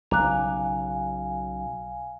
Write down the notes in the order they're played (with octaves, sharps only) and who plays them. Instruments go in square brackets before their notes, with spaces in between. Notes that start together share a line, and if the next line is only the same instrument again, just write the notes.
[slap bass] B1 C#3 [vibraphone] F5 G#5 [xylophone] A#5 D6 F#6